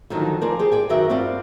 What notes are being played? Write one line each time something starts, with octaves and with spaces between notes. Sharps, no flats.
D3 D#3 F3 F#3 D4 D#4
F3 A#4 C5 D5 G#5
G4 G#4 C5
D5 G5 G#5
F#2 D#3 F#4 G4 A#4 E5
G2 C4 F4 D5 F#5